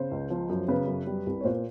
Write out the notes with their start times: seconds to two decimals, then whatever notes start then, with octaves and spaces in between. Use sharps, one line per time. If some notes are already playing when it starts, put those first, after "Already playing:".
Already playing: C#3 C5
0.11 C#2
0.30 F3
0.49 F#2
0.68 C#3 B4
0.88 F#2
1.07 G3
1.26 C2
1.41 C#5
1.44 A#2 C5